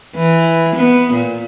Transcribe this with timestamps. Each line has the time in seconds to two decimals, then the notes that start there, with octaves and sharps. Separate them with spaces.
0.16 E3
0.75 B3
1.12 A#2